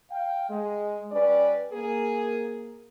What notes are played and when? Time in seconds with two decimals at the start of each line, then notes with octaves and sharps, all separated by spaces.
0.11 F5 G5
0.50 G#3
1.11 G3 C#4 B4 D5
1.73 A#3 G#4 A#4